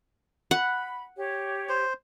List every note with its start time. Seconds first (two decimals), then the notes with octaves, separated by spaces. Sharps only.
0.51 F#5 B5
1.16 G4 C#5
1.69 C5